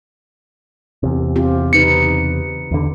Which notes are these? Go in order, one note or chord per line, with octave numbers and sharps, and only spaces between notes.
E2 C3
C4 F4 G4
C#3 D#4 B4 C#7
E2 D3